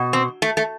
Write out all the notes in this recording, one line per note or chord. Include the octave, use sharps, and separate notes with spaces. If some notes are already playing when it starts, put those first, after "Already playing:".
Already playing: B2
C4
A3
A3